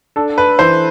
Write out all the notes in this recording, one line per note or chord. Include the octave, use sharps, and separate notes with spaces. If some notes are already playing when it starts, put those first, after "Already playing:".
D4 A4
B4
E3 C5